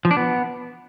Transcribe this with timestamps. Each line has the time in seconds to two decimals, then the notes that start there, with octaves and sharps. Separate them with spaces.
0.05 F3
0.11 D4
0.17 B3